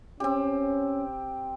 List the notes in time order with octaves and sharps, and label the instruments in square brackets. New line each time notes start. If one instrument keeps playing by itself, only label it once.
[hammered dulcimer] C4 G4 [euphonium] C#4